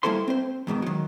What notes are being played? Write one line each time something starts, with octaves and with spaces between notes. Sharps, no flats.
G3 A#3 E4 A4 C5 C6
C4 C5
E2 G#2 B2 D#3
D#3 F#3